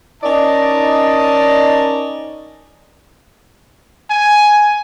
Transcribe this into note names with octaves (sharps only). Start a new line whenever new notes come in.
C#4 D#4 A#4 D5 D#5 A5
G#5